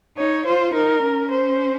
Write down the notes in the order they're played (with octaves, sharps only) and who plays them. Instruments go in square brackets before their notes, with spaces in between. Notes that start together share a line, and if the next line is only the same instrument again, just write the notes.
[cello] D#4 [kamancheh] C#5
[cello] F4 [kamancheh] C5
[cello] D#4 [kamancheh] A#4
[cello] C#4
[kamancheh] C5